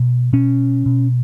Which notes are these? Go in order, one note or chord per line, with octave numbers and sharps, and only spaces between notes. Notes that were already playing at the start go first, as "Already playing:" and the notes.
Already playing: B2
B2 C#4
B2